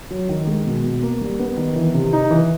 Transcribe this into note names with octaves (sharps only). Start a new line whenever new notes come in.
F#3
D#3
G#3
B2
B2
A#3
G3
B3
D#3
E3
C3
D#4
E3